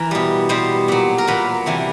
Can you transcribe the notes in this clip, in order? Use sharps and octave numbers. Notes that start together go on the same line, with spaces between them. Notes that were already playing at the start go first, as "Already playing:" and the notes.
Already playing: E3 A#4
B2 G3
B2 G3 C5
A#2 F#3
A#4
A#2 F#3 B4
C3 E3 G3